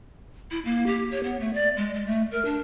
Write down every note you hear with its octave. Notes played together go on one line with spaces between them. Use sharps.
E4
A#3
G4
C#5
B3
A3
D5
G#3
G#3
A3
A#4
D4